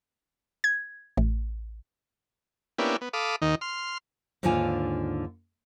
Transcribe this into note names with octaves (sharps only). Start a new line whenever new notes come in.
G#6
A1
A#3 B3 C#4 D4 E4 G4
B3
A4 F5 B5 D6 D#6
D#2 D#3 D#4
C6 F6
D#2 G#2 D3 D4 F4 G#5